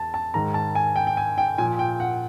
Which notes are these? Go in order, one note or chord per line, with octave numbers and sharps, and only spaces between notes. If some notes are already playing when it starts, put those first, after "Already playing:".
Already playing: E2 A5
A5
G#2 D#3 A#5
A5
G#5
G5
G5
G#5
G5
A#2 F3 G#5
G5
F#5